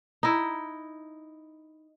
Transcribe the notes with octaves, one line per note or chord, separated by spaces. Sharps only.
D#4 E4